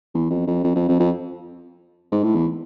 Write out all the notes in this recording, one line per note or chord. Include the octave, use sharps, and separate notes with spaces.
E2
F2
F2
F2
F2
F2
F2
G#2
A2
E2